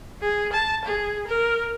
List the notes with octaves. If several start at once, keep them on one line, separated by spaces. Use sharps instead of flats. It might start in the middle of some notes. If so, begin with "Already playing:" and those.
G#4
A5
G#4
A#4